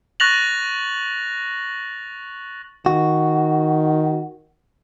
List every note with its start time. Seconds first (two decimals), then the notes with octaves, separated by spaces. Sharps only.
0.20 C#6 F#6 A6 A#6 F7 F#7
2.86 D#3 F#4